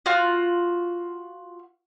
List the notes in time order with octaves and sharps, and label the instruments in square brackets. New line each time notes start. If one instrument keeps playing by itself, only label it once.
[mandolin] F4 F#4